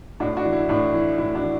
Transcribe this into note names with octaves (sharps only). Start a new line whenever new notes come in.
A2 D4 F#4
D4 F#4
E3
E4
A2 D4
E3 E4
A2 E4
D4 F#4
E3